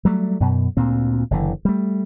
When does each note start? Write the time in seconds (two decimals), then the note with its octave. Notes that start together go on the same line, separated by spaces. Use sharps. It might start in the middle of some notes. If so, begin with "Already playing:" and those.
0.05 F#3 G3 A3
0.40 F#2 B2
0.77 D2 A#2 C4
1.31 F#1 D3 E3
1.65 G3 A3